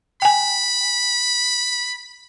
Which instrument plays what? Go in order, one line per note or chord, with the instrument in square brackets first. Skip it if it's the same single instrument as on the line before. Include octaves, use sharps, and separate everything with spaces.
[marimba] G5 G#5 [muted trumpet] B5